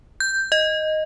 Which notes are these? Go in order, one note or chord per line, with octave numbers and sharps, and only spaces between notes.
G6
D#5